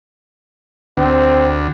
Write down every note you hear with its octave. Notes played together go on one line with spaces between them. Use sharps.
D2 C4